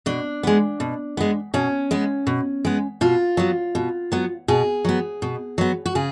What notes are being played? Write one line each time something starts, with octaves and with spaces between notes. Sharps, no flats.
B2 D4
G#3 B3
B2
G#3 B3
B2 C#4
G#3 B3
B2
G#3 B3
B2 F4
F#3 B3
B2
F#3 B3
B2 G#4
F#3 B3
B2
F#3 B3
F#4
C#3 G#4